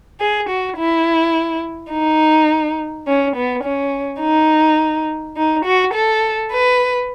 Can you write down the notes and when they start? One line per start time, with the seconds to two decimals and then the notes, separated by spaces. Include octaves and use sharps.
0.20 G#4
0.49 F#4
0.78 E4
1.92 D#4
3.07 C#4
3.36 B3
3.64 C#4
4.21 D#4
5.37 D#4
5.65 F#4
5.93 A4
6.51 B4